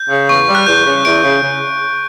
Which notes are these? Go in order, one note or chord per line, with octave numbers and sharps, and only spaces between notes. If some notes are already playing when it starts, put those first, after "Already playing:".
Already playing: G6
C#3
E2 C#6
G3
F#6
E2 G6
C#3
E2 D7
C#3
C#3